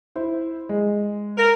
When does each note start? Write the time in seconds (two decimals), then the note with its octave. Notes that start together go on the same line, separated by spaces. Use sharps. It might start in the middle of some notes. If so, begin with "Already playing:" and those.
0.16 E4 C5
0.69 G#3
1.36 A#4